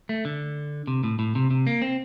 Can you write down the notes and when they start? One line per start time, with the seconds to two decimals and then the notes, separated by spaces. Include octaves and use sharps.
0.09 A3
0.25 D3
0.87 C3
1.04 A2
1.19 A2
1.35 C3
1.51 C3
1.67 A#3
1.82 C4